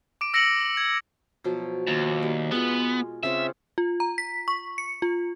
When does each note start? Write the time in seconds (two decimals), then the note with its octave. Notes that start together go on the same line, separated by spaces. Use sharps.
0.21 D6 D7
0.34 E6 A#6 C#7 D7 F#7
0.77 G#6
1.44 B2 F3 F#3
1.87 D#2
2.22 G3
2.52 G#3 B3 F4
3.23 C#3 C4 F4 E5
3.78 F4
4.00 A#5
4.18 B6
4.48 C#6
4.78 C#7
5.02 F4